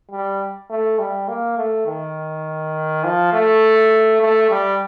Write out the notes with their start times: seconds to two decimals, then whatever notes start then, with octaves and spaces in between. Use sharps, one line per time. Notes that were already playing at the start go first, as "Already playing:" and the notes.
0.11 G3
0.70 A3
0.99 G3
1.28 A#3
1.57 A3
1.87 D#3
3.04 F3
3.33 A3
4.21 A3
4.50 G3